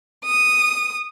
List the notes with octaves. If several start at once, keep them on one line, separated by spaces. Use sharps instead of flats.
D#6